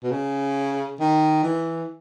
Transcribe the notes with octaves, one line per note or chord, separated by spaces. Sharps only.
B2
C#3
D#3
E3